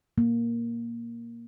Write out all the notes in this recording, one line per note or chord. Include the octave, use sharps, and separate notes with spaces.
A#3